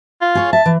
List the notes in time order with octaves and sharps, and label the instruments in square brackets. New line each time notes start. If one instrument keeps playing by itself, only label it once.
[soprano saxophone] F4
[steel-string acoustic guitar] G#4 C#5
[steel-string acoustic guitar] E5 [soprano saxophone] A5
[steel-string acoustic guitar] E3